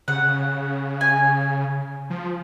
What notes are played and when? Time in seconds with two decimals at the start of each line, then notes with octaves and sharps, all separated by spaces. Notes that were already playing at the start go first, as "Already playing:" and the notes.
0.08 C#3 F#5
1.01 G#5
2.10 F3